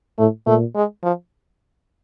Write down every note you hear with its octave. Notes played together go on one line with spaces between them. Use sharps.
A2 A3
A#2 A3
G#3
F3